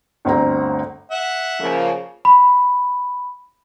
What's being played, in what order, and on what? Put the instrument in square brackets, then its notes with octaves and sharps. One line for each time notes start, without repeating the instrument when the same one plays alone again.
[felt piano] G1 D2 C4 A#5
[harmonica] E5 F#5
[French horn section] C#3 F3 A#3
[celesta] B5